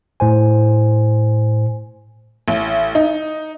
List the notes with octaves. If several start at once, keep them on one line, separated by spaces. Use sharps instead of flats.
A2 C5 G#5
A1
D#4